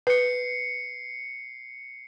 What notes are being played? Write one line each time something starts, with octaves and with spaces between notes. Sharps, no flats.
B4 C7 C#7